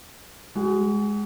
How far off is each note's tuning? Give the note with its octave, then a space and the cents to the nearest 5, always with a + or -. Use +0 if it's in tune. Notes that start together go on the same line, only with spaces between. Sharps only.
G#3 +0 F#4 +35